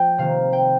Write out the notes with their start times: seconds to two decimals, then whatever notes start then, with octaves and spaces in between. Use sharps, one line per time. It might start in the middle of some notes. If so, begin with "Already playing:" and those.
Already playing: F3 A3 G5
0.18 C3 D#3 A#3 F5
0.53 G5